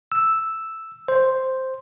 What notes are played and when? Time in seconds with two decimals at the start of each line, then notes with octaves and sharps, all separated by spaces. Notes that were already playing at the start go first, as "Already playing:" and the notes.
0.12 E6
1.08 C5